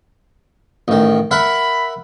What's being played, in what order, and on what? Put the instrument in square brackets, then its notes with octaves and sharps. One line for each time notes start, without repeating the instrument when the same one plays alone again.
[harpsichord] A1 D#3
[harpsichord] A#4 E5 F#5 [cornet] B5